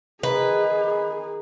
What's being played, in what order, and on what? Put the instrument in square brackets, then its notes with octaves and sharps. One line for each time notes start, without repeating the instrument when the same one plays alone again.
[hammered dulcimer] D#3 [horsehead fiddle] G#4 [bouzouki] B4